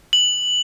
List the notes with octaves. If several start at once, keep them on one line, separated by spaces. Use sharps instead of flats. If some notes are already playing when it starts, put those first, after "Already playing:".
F#7